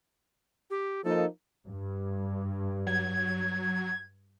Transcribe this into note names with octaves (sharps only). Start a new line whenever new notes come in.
G4
F3 A#3 D#4 A4
G2
F#3 G#6